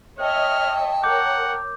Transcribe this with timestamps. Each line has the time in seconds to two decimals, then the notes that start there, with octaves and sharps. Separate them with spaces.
0.20 C#5 D#5 E5 G5 A5 F6
1.04 A#4 C#5 F#5 D6 G6